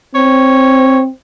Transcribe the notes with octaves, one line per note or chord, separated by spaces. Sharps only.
C4 C#5